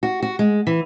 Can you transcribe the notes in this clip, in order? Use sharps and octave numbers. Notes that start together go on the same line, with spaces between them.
F#4
F#4
G#3
E3